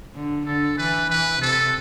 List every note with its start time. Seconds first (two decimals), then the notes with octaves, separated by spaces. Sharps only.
0.15 D3
0.46 D3 A4
0.78 E3 B4
1.10 E3 B4
1.40 C3 A4